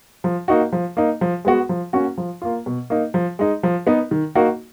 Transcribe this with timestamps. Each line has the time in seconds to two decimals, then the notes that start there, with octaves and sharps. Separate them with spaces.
0.24 F3
0.48 A#3 D#4 F#4
0.72 F3
0.97 A#3 D#4
1.21 F3
1.45 G#3 B3 F#4
1.69 F3
1.93 A#3 C#4 F#4
2.18 F3
2.42 A#3 F4
2.66 B2
2.90 A#3 D#4
3.14 F3
3.39 G#3 D#4
3.63 F3
3.87 B3 D#4
4.11 D#3
4.35 A#3 D#4 F#4